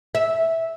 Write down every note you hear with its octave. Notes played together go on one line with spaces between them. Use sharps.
E5